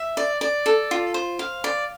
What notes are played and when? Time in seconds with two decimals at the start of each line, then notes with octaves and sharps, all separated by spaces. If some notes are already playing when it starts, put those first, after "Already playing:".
Already playing: E5
0.17 D5
0.41 D5
0.66 A4
0.91 F4
1.14 C5
1.39 F5
1.64 D5